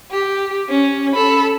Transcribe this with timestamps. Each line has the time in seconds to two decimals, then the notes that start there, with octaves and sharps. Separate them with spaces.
0.11 G4
0.69 C#4
1.13 A4 B5